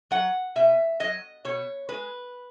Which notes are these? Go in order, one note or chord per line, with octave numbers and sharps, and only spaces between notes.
F#3 F#5
B2 E5
F#3 D#5
B2 C#5
G#3 B4